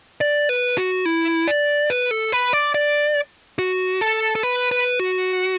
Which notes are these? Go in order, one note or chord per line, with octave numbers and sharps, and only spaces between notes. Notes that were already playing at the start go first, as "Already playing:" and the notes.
D5
B4
F#4
E4
D5
B4
A4
B4
D5
D5
F#4
A4
A4
B4
B4
F#4